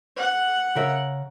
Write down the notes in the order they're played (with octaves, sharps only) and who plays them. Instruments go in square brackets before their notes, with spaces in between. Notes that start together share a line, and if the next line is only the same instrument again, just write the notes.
[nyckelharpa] F#5
[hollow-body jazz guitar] C#3 A#4 E5